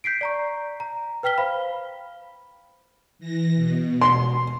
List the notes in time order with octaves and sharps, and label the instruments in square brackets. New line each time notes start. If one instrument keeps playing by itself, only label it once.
[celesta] G6 B6 C7 D7
D5 A#5 C#6
A#5
B4 G5 F6 B6 G7
C5 F5 B5
[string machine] E3 A#6
B2
[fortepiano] C6